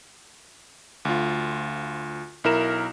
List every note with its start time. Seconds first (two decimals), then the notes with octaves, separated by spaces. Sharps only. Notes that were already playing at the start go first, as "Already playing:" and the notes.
1.05 D2 F4
2.44 B1 E4 A#4 E7